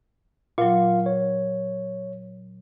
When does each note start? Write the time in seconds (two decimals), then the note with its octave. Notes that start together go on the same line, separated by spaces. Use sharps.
0.58 A#2 F#3 F4 F5
1.06 C#5